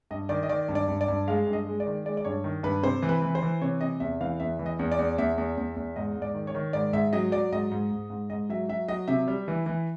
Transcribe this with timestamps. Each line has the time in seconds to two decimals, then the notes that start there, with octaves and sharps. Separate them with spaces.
0.11 G2 D#5
0.29 D#3 D5
0.43 D#5
0.49 D#3 D5
0.69 G2
0.75 D5
0.88 G2
1.01 D5
1.08 G2
1.28 G#3 F5
1.47 G2
1.53 D#5
1.67 G#3
1.80 D5
1.86 D#3
2.05 G#3 D5
2.17 D5
2.25 G2 C#5
2.44 D#3
2.63 G2 B4
2.83 C3 C5
3.02 E3
3.09 B4
3.22 E3
3.35 C5
3.42 E3
3.61 C3 C#5
3.80 C3 D#5
4.00 E2 E5
4.20 E3 F5
4.40 E2 E5
4.59 E3
4.66 D#5
4.79 E2
4.92 D5
4.99 E2
5.18 E2 E5
5.38 E2
5.57 E2
5.76 E2
5.96 G#2 D#5
6.15 G#2
6.22 D5
6.34 D#3
6.47 C#5
6.55 D#3
6.73 G#2 D5
6.93 G#2 E5
7.13 F#3 D#5
7.32 F#3 D5
7.52 G#2 D#5
7.71 G#2
7.91 G#2
8.10 G#2
8.30 G#2 D#5
8.49 F#3 E5
8.69 F#3 E5
8.88 F#3 D#5
9.08 C3 E5
9.28 G3
9.48 E3
9.66 E3